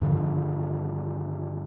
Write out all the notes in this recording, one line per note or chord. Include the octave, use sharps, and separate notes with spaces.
G2 D3 D#3 F3